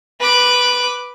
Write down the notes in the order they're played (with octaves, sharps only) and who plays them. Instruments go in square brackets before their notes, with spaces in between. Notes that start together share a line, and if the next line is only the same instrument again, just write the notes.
[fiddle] B4 D6